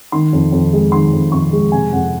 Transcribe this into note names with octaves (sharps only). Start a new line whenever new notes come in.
D#3 C6
F2
F2
G#3
D#3 C6
F2
F2 C#6
G#3
C3 G#5
F2 F#5